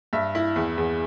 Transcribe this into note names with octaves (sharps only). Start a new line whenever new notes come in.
G2 E5
E4
E2
E2